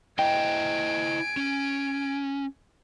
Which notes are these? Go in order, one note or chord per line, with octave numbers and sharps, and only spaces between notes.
E4 C5 D#5 G5 G#5 D7
C#4